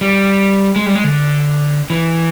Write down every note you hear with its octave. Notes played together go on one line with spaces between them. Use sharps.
G3
G#3
G3
G#3
D3
E3